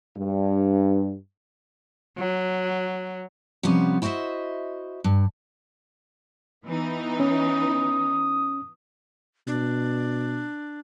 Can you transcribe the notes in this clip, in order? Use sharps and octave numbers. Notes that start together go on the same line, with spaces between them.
G2
F#3
C3 F3 G3 B3 C#4
E4 F#4 C5 D#5 E5
G2
E3 B3 D#4
C#4 D#6
B2 D4